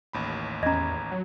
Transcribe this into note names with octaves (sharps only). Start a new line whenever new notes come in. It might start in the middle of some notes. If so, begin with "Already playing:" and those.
A1 D#2 B5
E2 C#4 D#5 A#5 G#6
F#3